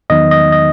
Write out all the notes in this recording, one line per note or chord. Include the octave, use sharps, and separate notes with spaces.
E2 D#3 F#3 B3 D#4 D#5
D#5
D#5